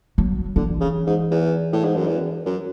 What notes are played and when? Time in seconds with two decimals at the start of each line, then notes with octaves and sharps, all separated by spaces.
0.18 F#3
0.56 D3 E3
0.80 C#3
1.07 G#2
1.31 E2
1.73 A2
1.84 G#2
1.96 F#2
2.07 E2
2.46 F#2